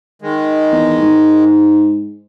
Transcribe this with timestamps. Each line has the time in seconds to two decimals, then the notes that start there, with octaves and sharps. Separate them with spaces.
0.22 D#3 G#3
0.72 E2
1.02 G#2